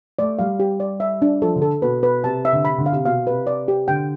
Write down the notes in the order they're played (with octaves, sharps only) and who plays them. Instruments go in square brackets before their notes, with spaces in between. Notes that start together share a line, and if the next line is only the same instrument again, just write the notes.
[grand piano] A3 [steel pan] D5
[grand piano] G3 [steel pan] F5
[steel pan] G4
D5
E5
D4
[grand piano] F3 [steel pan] A4
[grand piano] D3
[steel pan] A4
[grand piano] B2 [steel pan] B4
[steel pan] B4
[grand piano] C3 [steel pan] A5
[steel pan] E5
[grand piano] D3
[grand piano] C3 [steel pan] B5
[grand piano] D3
[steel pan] F5
[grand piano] C3
[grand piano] B2 [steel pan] F5
[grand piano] C3 [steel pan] B4
[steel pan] D5
G4
[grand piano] D3 [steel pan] G5